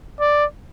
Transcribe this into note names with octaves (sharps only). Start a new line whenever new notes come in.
D5